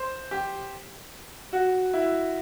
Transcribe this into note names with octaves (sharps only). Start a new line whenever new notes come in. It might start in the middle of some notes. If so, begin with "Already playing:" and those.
Already playing: C5
G4
F#4
E4